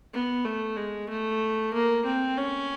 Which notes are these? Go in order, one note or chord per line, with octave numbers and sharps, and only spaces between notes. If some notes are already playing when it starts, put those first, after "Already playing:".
B3
A3
G#3
A3
A#3
C4
C#4